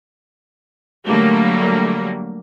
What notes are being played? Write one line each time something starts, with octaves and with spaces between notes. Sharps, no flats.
D3 F#3 G3 A3 A#3